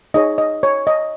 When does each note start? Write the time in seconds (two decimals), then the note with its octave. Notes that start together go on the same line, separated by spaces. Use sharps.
0.14 D#4 G#4 C#5 D#5
0.38 D#5
0.63 C#5
0.87 D#5